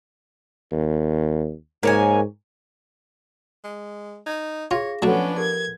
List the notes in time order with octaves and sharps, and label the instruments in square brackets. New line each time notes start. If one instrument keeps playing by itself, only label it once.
[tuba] D#2
[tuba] G#2 [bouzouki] A#3 C#5 G#5
[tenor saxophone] G#3
[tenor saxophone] D#4 [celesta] G#6
[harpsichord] F4 [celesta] G#4 F5 A#6 [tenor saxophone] C#5
[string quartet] F3 B3 C#4 [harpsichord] F#3 A3 [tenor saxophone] D4 [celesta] C#5 F#5
[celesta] G4 A4 A#4 [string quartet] G#6